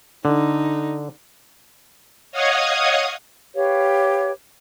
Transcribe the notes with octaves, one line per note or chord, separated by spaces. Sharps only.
D3 D#4
C#5 D#5 F5 F#5 D#6 G#6
G4 B4 C#5 F5